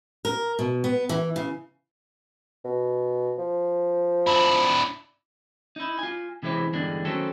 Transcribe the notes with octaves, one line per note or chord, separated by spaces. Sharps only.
A#4
B2
B3
E3
C#3
B2
F3
D4 E4
D#4 E4
F4 G#5
C3 E3 G#3 C4 E4
E2 G2 D3 G#3 D4
D#3 F#3 A3 C4 C#4 A4